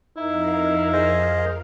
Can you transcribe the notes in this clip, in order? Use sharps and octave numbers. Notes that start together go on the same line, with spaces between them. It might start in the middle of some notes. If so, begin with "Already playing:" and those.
F2 D#4 E4 A#4 F5
G#4 C5 D#5